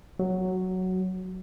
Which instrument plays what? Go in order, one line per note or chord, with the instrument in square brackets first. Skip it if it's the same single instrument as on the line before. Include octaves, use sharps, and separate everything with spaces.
[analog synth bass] F#3